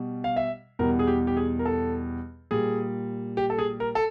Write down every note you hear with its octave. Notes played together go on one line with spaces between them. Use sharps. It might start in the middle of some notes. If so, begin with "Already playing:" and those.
Already playing: B2 G3
F5
E5
E2 B2 G3 A#4
G#4
G4
G4
G#4
A#4
A4
A#2 G3 G#4
G4
A4
G#4
A#4
A4